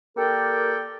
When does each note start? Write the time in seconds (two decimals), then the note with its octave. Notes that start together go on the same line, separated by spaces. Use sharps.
0.17 A#3 G4 A4 A#4 D5 G5